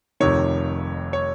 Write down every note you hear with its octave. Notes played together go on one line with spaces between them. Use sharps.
F1 F2 C3 D#3 C#5
C#5